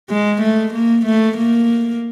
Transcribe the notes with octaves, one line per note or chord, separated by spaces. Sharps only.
G#3
A3
A#3
A3
A#3